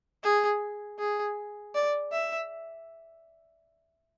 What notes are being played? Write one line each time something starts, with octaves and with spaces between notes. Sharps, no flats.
G#4
G#4
D5
E5